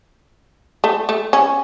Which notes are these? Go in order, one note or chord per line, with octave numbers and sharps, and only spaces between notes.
A3
A3
C#4